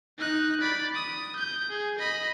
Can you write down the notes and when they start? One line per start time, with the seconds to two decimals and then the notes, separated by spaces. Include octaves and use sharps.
0.18 D#4 F#6
0.61 D5 B5
0.94 D#6
1.36 G6
1.70 G#4
1.99 D#5 B5